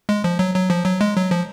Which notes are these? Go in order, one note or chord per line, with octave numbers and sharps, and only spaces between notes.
G#3
F3
F#3
F#3
F3
F#3
G#3
F#3
F3